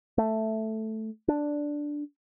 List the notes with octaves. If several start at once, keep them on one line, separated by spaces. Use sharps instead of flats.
A3
D4